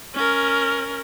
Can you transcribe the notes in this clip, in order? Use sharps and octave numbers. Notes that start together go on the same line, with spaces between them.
C#4 A#4